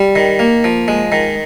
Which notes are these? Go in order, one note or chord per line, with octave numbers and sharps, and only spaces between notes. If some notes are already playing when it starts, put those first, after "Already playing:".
Already playing: G3
D#3
A#3
F3
G#3
D#3